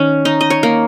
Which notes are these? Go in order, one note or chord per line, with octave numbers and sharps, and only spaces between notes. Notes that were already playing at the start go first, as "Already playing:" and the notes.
Already playing: D#3 C#4
D#4
D#5
C#5
A#3